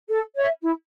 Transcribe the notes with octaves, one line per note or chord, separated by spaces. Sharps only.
A4
C#5 E5
E4